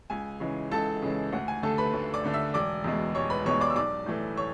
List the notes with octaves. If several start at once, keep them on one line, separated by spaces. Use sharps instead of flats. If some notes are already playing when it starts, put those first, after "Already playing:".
C#2 G#5
C#3 E3 G#3
C#2 A4 A5
C#3 E3 G#3
D2 F#5
G#5
D3 A3 A4 A5
B4 B5
D2
D5 D6
D3 A3
E5 E6
E1 D5 D6
E2 B2 G#3
E1 C#5 C#6
B4 B5
E2 B2 G#3 C#5 C#6
D5 D6
E6
B1 D5 D6
A2 E3 A3
C#5 C#6